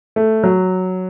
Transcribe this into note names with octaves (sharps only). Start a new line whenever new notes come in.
A3
F#3